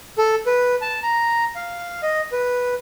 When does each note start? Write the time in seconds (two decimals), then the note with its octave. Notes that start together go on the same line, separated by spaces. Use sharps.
0.18 A4
0.47 B4
0.82 A5
1.03 A#5
1.55 F5
2.03 D#5
2.32 B4